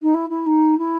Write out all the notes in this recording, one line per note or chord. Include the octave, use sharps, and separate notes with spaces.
D#4
E4
E4
D#4
E4